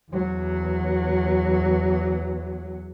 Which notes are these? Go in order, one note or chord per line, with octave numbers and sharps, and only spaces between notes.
E2 F#3